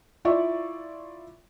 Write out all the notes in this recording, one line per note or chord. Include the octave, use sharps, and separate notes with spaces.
E4 F4 D5 E5 C#6